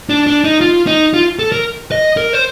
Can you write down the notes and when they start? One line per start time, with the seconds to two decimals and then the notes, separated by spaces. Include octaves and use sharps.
0.10 D4
0.27 D4
0.45 D#4
0.61 F4
0.87 D#4
1.14 F4
1.39 A4
1.52 A#4
1.92 D#5
2.17 A#4
2.33 C5